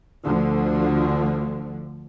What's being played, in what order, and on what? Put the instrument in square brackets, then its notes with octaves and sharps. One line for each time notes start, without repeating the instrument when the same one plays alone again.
[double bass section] D2 D3 F3